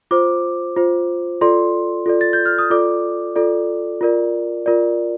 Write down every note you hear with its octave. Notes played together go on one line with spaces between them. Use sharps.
F4 C5 D6
F4 C5
F4 A4 D5 C6
F4 A4 D5
A6
G6
F6
D#6
F4 A4 D5 D6
F4 A4 D5
F4 A#4 D5
F4 A#4 D5